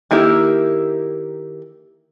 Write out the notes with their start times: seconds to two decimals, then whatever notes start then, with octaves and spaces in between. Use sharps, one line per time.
0.11 D#3 A#3 E4 G4